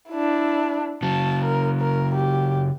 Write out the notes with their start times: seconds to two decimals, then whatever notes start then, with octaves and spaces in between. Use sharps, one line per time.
0.10 D4 E4
1.03 C#3 F#3 A5
1.45 A#4
1.80 A#4
2.15 G4